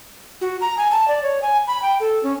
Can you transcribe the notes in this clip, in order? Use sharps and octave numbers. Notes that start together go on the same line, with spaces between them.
F#4
A#5
G#5
A5
D5
C#5
G#5
B5
G5
A4
C#4